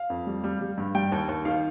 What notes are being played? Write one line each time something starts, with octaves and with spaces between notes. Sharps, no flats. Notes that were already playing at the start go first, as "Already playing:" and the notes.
Already playing: F5
F2
G3
G3
G3
G2
G3 G5
D#2
D#2
D#3 F5